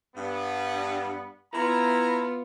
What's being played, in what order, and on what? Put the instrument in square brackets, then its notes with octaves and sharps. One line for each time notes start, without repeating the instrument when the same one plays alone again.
[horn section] G2 B3
[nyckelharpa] B3 F4 [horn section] E4 A#5